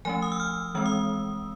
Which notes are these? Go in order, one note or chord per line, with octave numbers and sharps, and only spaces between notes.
F3 A3 C#4 G#5
D#6
E6
F6
E3 G#3 C4 E6
D#6